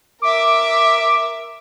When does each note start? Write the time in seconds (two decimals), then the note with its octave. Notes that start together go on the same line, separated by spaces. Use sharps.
0.22 A#4 E5 D6